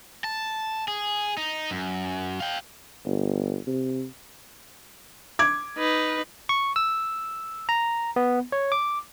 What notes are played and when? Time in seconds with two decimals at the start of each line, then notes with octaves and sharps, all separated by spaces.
0.24 A5
0.88 G#4
1.37 D#4
1.71 F#2
2.40 F5 G5
3.05 G1
3.67 C3
5.39 D6 G#6
5.78 D#4 B4
6.49 C#6
6.76 E6
7.69 A#5
8.16 B3
8.52 C#5
8.72 D6